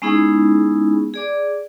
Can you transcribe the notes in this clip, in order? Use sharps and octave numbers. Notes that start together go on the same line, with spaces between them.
G#3 B3 C#4 D#4 E4 G#4
G#4 D5 D6